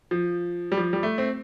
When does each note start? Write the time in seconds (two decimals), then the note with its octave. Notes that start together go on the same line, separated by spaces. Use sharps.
0.11 F3
0.72 G3
0.77 F3
0.93 G3
1.03 A3
1.18 C4